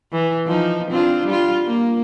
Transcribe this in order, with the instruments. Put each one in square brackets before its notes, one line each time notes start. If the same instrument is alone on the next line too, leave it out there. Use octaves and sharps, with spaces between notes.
[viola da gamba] E3
F3 D#4
C4 D4 F4
G3 F4
A#3